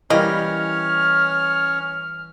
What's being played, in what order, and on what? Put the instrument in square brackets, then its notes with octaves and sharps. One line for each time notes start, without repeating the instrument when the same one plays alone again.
[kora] E3 G3 [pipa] A#3 D#5 [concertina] C#4 C#5 [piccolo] F6